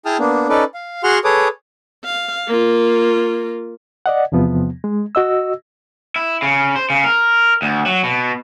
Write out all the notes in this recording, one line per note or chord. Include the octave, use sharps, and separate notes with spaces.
E4 G#4 G5 A5 D#6 F6
A#3 B3 D4
C#4 D#4 A4 B4 D5
F5
F#4 G#4 F#5 C6 F6
G#4 A4 B4 C#5 D6 D#6
F5
A#3 F4
D5 D#5 F#5
E2 C3 F3 B3
G#3
F#4 D#5 E6
E4
C#3
C5
C#3
A#4
D2
F#3
B2